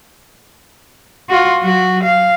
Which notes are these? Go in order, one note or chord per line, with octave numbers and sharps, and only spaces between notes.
F4 F#4
F#3 F#4
F5